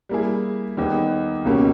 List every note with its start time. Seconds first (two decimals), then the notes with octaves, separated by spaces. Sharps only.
0.09 G3 A#3 E4 G#4
0.77 D#2 D#3 G3 B3 D#4
1.45 C#2 B2 A#3 C#4 G4